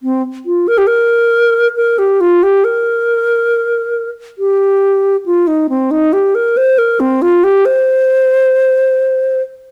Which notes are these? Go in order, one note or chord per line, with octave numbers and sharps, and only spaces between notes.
C4
F4
A#4
G4
A#4
A#4
G4
F4
G4
A#4
G4
F4
D#4
C4
D#4
G4
A#4
C5
A#4
C4
F4
G4
C5